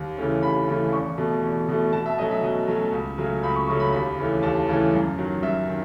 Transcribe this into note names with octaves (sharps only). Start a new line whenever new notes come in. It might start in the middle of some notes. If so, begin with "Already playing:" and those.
Already playing: D#2
C#3 E3 A3 C#4
D#2 B5
C#3 E3 A3 C#4
E2 C#6
B2 A3
E2
B2 A3
B2 A5
E5
F#3 A3 C#4 D#5
E5
B2 D#5
F#3 A3 C#4
C#2
C#3 F#3 A3 C#4
C#2 B5
C#6
C#3 F#3 A3 C#4 C#6
B5
D#2 B5
C#3 E3 A3 C#4
D#2 A5
C#3 E3 A3 C#4
F#2
D#3 F#3
F#2 E5
D#3